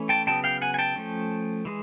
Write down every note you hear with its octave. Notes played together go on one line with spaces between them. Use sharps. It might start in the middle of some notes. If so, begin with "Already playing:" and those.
Already playing: E3 A3 C#4
G5 A5
C#3 F#3 B3 G5 A5
F5 G5
F#5 G#5
G#5
G5 A5
F3 A3 C#4
E3 G#3